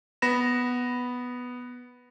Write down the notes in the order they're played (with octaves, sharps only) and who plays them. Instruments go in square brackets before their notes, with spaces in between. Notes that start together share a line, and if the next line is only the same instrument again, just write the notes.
[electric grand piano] B3 B5 A#6 E7